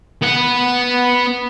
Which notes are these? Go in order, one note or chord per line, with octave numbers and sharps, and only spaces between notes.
B3 F#5